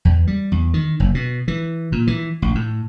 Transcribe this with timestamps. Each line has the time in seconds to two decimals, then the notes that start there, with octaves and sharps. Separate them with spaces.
0.05 E2
0.27 G3
0.52 E2
0.74 D#3
1.00 F#1
1.15 B2
1.48 E3
1.92 A#2
2.07 E3
2.42 A1
2.55 A2